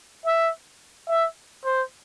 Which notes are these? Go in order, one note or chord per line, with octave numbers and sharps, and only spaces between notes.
E5
E5
C5